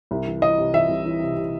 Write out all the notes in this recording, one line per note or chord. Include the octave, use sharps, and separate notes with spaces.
C2
E3
E3 D#5
C3
E3 E5
C2
E3
C3
C3